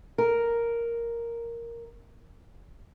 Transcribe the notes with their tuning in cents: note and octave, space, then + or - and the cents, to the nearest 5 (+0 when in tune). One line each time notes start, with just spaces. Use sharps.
A#4 +0